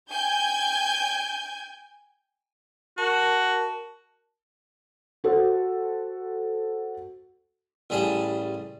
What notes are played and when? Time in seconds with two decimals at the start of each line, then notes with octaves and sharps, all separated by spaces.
0.11 G5 G#5 G6 G#6
2.98 F#4 A#4 A5
5.24 F#4 A4 C5
7.90 A1 G3 G#4 A5